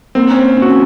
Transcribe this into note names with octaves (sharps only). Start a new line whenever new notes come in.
A#3 C4
C#4 C5
C#4
F#4